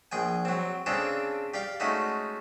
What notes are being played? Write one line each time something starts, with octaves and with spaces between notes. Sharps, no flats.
A#1 G#4 G5 G#5
F#3 C4
C#3 C4 D4 G#4 A4
G4 D5 F5 G5
G#3 A3 C#4 D#4 F#4